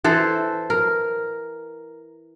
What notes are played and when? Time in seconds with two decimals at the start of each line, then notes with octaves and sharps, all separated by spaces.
0.04 E3 A4 C5
0.70 A#4